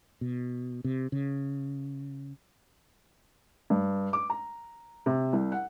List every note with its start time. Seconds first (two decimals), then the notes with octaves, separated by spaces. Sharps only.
0.21 B2
0.84 C3
1.12 C#3
3.70 G2
4.13 D6
4.30 A#5
5.06 C3
5.33 C2
5.52 F#5